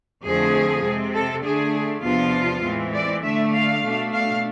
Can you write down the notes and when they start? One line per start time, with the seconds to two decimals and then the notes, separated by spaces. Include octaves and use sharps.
0.23 F2 D3 F3 A3 C4 G#4
0.83 C3 G#3 C4
1.13 A4
1.43 D3 A3 D4 G#4
2.03 E2 C3 F3 B3 D4 F4
2.63 A2 E3 G#3 C4
2.93 D5
3.23 D3 A3 D4 E5
3.53 F5
3.83 B2 A3 D4
4.12 F5